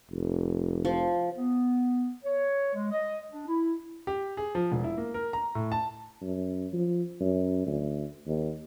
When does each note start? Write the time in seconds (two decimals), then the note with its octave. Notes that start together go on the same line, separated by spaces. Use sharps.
0.11 F1
0.85 F3
1.37 B3
2.23 C#5
2.74 G#3
2.90 D#5
3.30 D4
3.47 E4
4.07 G4
4.37 G#4
4.55 F3
4.72 E1
4.84 E4
4.98 A#3
5.14 A#4
5.33 A#5
5.55 A2
5.72 A5
6.21 F#2
6.73 F3
7.20 F#2
7.66 D2
8.27 D#2